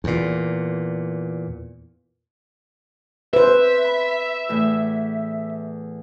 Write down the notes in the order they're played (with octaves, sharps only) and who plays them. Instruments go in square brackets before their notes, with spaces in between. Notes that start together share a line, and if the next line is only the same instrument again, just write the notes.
[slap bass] E2 A#2
[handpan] B4 C5 [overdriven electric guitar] E5
[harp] B5
E2 A2